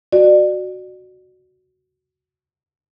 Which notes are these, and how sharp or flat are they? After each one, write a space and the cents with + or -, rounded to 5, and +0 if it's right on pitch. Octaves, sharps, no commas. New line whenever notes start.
F#4 +0 D5 +30